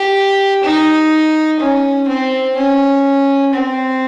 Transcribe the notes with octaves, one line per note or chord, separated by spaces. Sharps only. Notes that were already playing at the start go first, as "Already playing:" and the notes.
Already playing: G4
D#4
C#4
C4
C#4
C4